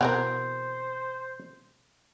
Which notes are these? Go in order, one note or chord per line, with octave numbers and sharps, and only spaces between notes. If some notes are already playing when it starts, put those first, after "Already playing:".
B2 E3 C4 A#4 C5 F#5